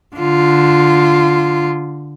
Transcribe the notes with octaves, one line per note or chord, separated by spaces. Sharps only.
D3 F4